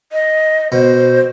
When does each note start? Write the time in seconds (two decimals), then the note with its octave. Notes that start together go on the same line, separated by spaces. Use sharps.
0.12 D#5
0.72 B2 C5